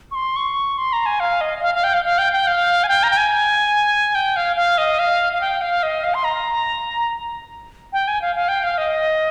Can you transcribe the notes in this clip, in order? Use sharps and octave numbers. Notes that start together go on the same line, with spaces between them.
C#6
C6
C#6
C6
A#5
G#5
F5
D#5
D#5
F5
F5
G5
F5
F5
G5
G5
F5
G#5
G5
A#5
G5
G#5
G5
F5
F5
D#5
F5
F5
G5
F5
D#5
F5
C6
A#5
G5
G#5
F5
F5
G5
F5
D#5